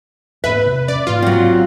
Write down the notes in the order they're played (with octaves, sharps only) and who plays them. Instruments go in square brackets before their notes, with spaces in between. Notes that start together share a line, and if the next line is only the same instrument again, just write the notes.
[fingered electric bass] E2 G#2 A#3 [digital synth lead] B4 [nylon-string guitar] E5
[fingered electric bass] C3
[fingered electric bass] C#4 [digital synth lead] D5
[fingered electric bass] A1 G#2 A#3 [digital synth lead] F4
[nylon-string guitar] F#3 C4